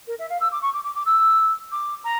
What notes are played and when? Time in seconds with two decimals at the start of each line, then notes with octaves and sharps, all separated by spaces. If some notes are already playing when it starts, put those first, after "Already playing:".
0.08 A#4
0.19 E5
0.30 F5
0.40 E6
0.52 D6
0.62 C#6
0.73 D6
0.84 D6
0.95 D6
1.06 E6
1.72 D6
2.04 A#5